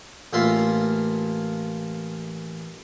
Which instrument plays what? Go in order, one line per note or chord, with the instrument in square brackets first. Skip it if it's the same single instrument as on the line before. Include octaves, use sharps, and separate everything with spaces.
[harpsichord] A1 A#3 F4 E5 C6